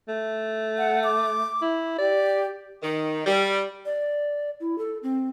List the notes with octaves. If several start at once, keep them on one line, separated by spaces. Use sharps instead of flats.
A3
F#5
D6
E4
G4 D5
D#3
G3
D5
E4
A4
C4